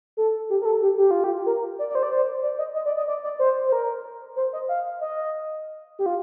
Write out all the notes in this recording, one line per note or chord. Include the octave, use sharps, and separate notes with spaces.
A4
G4
A#4
A4
G4
G4
F4
G4
A#4
D5
D5
C5
D5
C5
D5
D#5
D#5
D5
D#5
D5
D5
C5
C5
A#4
C5
D#5
F5
D#5
G4
F4